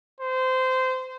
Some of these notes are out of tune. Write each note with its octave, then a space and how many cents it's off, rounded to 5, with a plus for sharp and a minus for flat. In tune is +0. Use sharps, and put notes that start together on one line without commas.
C5 -20